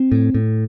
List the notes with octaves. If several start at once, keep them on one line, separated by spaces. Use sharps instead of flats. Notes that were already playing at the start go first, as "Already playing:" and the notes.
Already playing: C4
A2
A2